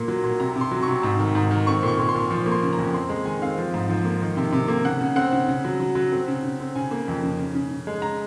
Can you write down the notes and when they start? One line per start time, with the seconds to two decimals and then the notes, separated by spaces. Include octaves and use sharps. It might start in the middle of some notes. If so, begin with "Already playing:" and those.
Already playing: A#2 A#3 C6
0.08 F#3
0.23 A#2
0.40 C3 A#5
0.56 C3
0.61 C6
0.72 F#3
0.83 C#6
0.88 C3
1.03 G#2
1.19 D#3
1.35 G#2
1.51 D#3
1.67 C4 C#6
1.83 A#2 C#6
1.99 A#2
2.09 C6
2.15 A#2
2.30 F3 C#6
2.46 A#3
2.52 C6
2.63 C#3
2.73 A#5
2.79 F2
2.94 C4 C6
3.09 G#3
3.25 D#3 G#5
3.42 C4 F5
3.58 F3
3.74 G#2
3.90 F3
4.05 A#3
4.22 D#3
4.37 C3
4.52 C3
4.68 A#3
4.84 C#3 F#5
5.01 C#3
5.16 C4 F#5
5.32 C#3
5.48 C#3
5.65 F#3
5.80 F#3
5.95 F#3
6.12 C4
6.28 C#3
6.44 C#3
6.60 C4
6.75 C#3 G#5
6.91 A#3
7.08 F2
7.23 C#3
7.39 C#3
7.55 C#3
7.71 C#3
7.87 G#3
8.02 A#5